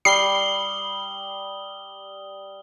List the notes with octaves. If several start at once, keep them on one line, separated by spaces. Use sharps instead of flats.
G3 D#6 C7 G7